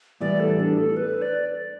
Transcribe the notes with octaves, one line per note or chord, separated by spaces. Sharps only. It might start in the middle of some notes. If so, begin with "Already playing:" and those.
A2 E3 G3 B3 D5
A4
D4
A4
B4
D5